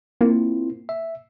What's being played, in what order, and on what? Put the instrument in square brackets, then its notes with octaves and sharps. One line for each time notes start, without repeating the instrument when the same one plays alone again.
[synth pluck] A#3 [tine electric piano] C4 E4 F4
[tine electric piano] E5